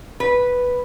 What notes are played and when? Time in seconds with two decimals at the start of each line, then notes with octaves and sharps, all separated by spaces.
0.20 B4